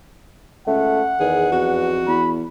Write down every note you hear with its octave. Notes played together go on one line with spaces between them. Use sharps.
C#2 A3 F#5
E2 D#3 G#4
F2 F#4
E2 B5